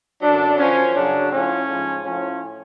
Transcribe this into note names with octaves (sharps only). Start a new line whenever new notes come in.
F#2 D3 F#3 D4
F#2 F3 C#4
F#2 C#3 F#3 D4
A2 F3 C#4
G#2 F3
A2 F3 C#4